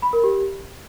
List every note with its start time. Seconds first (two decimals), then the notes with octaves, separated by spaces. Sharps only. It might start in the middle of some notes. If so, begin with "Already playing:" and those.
0.02 B5
0.13 A#4
0.24 G4